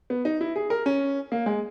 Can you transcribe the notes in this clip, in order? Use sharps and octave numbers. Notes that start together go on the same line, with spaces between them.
B3
D#4
E4
G#4
A#4
C#4
A#3
G#3